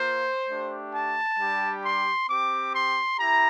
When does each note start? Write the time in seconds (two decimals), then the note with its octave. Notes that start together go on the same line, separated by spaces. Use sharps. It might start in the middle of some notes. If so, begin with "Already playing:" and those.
Already playing: A#3 F4 C5
0.47 A3 D4 G4
0.92 A5
1.37 G3 D4 G4
1.82 C6
2.28 C4 G4 D6
2.73 C6
3.18 E4 G4 A#5